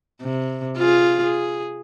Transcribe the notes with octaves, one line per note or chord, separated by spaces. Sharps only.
C3
F4 G#4
G#4